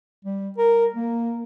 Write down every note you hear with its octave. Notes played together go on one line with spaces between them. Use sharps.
G3
A#4
A#3